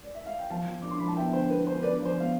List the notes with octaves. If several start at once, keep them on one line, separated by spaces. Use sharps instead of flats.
D5
E5
F5
G5
F3 F5 A5
F3
D4 D6
C6
F3 B5
A5
B3 E5 G5
D3 C5
B3 B4
D4 C5
D4 B4 D5
F3
C5
B3 F5